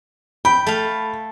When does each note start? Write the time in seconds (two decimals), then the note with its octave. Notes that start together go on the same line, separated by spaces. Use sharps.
0.45 G5 B5
0.67 A3 F5